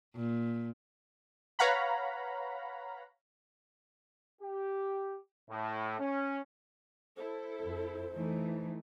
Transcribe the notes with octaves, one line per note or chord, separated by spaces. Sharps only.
A#2
B4 C#5 F5 F#5 A#5 B5
G4
A2
C#4
E4 A4 C5
F2
E3 A3 D#4